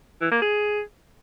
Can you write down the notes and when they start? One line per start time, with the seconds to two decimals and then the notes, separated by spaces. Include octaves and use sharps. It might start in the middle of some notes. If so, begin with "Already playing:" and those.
0.21 E3
0.31 A#3
0.42 G#4